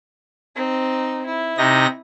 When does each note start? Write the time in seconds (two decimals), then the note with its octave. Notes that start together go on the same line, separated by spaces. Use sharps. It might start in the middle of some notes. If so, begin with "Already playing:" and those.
0.56 C4 D#4
1.26 E4
1.58 C3 D#4 A#6